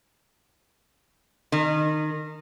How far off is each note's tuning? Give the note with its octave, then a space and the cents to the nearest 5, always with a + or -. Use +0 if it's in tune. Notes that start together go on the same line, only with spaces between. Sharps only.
D#3 -20